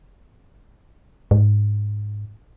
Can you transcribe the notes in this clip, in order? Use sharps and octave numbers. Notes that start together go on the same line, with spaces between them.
G#2